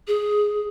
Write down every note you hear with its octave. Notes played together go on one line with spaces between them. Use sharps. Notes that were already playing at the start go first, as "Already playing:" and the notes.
G#4